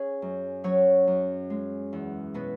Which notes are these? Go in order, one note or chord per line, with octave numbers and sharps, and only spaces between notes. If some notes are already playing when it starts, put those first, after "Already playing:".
Already playing: C#4 G#4 G#5
F#2
F#3 C#4 C#5
F#2
G#3
E2
B2 B3 B4